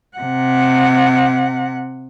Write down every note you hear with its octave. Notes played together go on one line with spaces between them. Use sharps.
C3 F#5